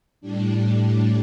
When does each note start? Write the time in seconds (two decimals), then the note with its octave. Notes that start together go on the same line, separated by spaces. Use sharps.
0.21 A2 G3 D4